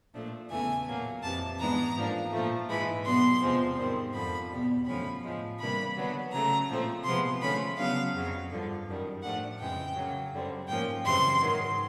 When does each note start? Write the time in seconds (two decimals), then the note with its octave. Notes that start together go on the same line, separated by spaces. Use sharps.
0.14 A#2 F3 A3 D4
0.50 E2 C#3 E3 A3 G#5
0.87 A#2 F#3 A#3
1.23 F2 C3 E3 A5
1.59 G#2 E3 G#3 B3 D4 A#5
1.95 G#2 F3 A#3 D4
2.32 A#2 F3 A3
2.68 G#2 E3 G#3 B5
3.04 B2 F#3 B3 D4 C6
3.41 E2 C3 F3 G#3 C4
3.77 G#2 D#3 G3 C4
4.14 F2 D3 F3 B5
4.51 E2 B2 G3
4.86 F#2 D3 F3 A3 C#4 B5
5.24 A2 F3 G#3
5.59 C3 E3 G3 A#3 D4 B5
5.96 D3 F#3 B3 D4
6.31 C#3 F#3 A3 A#5
6.69 A#2 F3 A3 C4
7.04 C3 F3 G#3 B3 C6
7.40 D3 F3 A3 C#4 B5
7.77 C#3 F#3 B3 D4 F5
8.14 F2 C#3 F#3
8.50 G2 D3 F3
8.87 F#2 D#3 G3
9.22 A2 F3 A3 D4 F#5
9.59 F2 C#3 E3 G#3 G5
9.95 C#3 F#3 A#3
10.32 F#2 D3 G3 C4
10.67 G#2 F3 A#3 C#4 G5
11.04 F#2 C#3 E3 G3 C4 C6
11.41 G#2 D#3 F#3